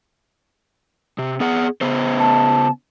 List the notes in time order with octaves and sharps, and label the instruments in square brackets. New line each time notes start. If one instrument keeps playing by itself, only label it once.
[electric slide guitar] C3
B3 G#4 F#5
C#3 B3 C5
[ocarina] A5